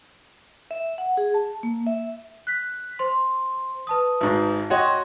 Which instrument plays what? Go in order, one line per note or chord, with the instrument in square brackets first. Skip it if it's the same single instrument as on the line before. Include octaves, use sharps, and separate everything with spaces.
[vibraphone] E5
F#5
G#4
A5
A#3
E5
[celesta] F#6 B6
C5 C6
B4 A5 D#6
[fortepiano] G#1 G#2
[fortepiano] F#4 C#5 D#5 [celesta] G5 C6